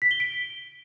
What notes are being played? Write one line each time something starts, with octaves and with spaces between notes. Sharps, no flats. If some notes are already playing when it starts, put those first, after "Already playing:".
B6
G7
D7